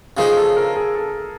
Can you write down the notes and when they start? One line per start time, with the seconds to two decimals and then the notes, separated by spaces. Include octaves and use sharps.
0.17 C#3 F3 A#3 D#4 G#4
0.37 A4
0.56 A#4
0.76 G#4
0.95 A4